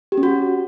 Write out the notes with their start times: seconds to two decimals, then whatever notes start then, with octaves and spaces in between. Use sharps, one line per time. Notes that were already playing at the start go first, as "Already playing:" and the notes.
0.12 G4
0.18 C#4
0.23 F#4